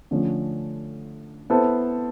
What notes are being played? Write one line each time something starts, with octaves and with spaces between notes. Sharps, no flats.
D3 F3 A3 C#4
B3 E4 A4 C5